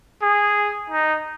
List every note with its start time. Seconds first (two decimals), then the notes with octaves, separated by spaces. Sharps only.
0.22 G#4
0.90 D#4